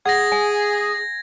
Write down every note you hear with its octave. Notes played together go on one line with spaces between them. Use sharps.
G#4 F#5 G#6 A#6
G#5